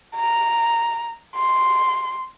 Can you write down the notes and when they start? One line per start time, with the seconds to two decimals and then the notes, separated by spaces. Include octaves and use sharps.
0.16 A#5
1.36 C6